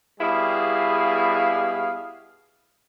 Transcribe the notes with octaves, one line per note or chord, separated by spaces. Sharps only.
B2 G3 B3 E4 G#4 F5